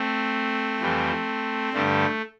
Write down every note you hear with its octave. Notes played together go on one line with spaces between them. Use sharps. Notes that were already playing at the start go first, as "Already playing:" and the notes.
Already playing: A3 C4
F2 E3 G3
G2 D3 G3 A3